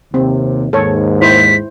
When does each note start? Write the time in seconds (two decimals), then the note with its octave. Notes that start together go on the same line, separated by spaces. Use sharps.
0.14 D#2 C3 C4
0.73 D#2 G#2 A4 C#5
1.22 E4 C5 B6